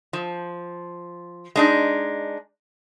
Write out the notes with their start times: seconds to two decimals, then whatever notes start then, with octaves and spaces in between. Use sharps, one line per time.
0.13 F3
1.56 G#3 D4 D#4